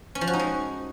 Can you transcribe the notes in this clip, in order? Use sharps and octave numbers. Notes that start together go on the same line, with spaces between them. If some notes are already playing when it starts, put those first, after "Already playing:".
C#4
F3
F#4
D#4
G#3